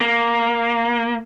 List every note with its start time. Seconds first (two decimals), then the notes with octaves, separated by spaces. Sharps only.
0.01 A#3